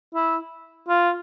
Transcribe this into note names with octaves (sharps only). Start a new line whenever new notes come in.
E4
F4